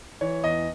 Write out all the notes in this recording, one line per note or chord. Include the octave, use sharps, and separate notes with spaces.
E3 C#5
E2 D#5